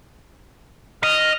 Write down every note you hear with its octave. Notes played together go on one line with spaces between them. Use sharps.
D#5 F6